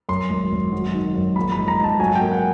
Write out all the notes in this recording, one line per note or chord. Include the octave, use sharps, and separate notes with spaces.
F#2 C6
G#1
G#1
F#3
D#3
F#2
A#1 B5
B5
G#2
A#5
G#2
A5
F#3 G#5
G5
A#3
F#5